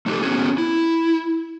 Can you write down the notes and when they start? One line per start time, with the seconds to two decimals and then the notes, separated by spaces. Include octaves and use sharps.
0.06 A3 D#4 F4 G4 A4
0.22 B3 C#4 F#4 G#4
0.58 E4